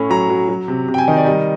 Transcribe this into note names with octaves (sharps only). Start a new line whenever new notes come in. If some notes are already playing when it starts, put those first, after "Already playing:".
Already playing: A2 C#4
F#3 A#5
F#3
F#3
C3
C3
G5
G#5
D#3 D#5
D5
G3 D#5